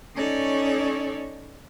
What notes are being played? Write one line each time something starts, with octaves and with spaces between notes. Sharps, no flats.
C#4 D#4 A4 C#5 D5